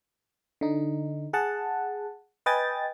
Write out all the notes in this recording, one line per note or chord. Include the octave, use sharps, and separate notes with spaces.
D3 D#4
G#4 F#5 A5
B4 D#5 G5 G#5 A6